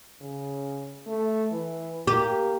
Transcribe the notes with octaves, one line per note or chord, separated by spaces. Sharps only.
C#3
A3
E3
A#3 G4